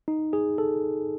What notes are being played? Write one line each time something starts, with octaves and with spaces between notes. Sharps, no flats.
D#4
G#4
A4